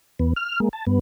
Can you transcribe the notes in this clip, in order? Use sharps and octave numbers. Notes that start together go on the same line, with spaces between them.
E2 B3
F6
G#3 A#3
A5
G2 B3